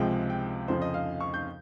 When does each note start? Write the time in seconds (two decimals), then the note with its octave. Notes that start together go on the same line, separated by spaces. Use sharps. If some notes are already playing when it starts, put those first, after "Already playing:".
Already playing: C#2 C3 F3 G#3 G5
0.30 G5
0.68 F2 C#3 F3 C5
0.82 D#5
0.94 F5
1.20 C#6
1.34 G6